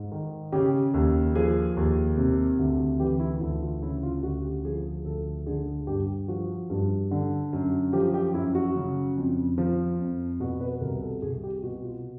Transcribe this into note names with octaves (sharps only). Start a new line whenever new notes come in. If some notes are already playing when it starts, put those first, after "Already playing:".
Already playing: G#2
D#3
C#3 G4
D#2
F3 G#4
D#2
C3
D2
E3 G4
E4
D2 E4
F4
C#3 E4
F4
D2 F#4
G4
F3 G#4
D2 A4
D3 G#4
G2 G4
F3 F#4
G2
D3
F#2
F3 G4
G4
F#2 E4
F#4
C#3
F2
F3
F2
B2 F#4
B4
C2 A#4
A4
C2 G#4
G4
B2 F#4
F4